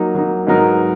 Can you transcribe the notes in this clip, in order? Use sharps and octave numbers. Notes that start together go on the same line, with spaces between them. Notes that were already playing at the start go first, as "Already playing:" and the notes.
Already playing: F#3 A#3 D#4
F#3 A#3 D#4
G#2 F#3 B3 D#4 A#4